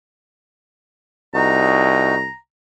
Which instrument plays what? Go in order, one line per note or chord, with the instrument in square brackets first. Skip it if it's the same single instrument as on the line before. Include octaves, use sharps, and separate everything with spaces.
[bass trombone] C2 [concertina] D#4 F#4 [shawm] A#5